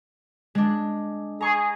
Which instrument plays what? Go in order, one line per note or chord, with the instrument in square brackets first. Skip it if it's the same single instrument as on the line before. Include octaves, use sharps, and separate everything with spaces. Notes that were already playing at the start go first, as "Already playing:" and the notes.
[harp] G#3 D4
[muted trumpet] G#4 [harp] A#5 C#6